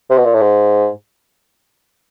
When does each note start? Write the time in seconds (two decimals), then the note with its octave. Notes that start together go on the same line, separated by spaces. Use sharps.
0.09 C3
0.18 B2
0.25 A#2
0.33 A2
0.40 G#2